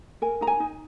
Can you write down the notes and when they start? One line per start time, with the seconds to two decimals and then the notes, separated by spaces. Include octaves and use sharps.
0.22 A#4 G#5
0.41 D#4 A#5
0.47 G#5
0.60 D#4